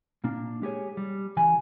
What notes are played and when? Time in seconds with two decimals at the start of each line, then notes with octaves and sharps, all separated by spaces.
0.24 A#2 A#3 D4
0.62 G#3 G4 G#4 C#5
0.97 G3
1.37 C#2 E3 G#5 B5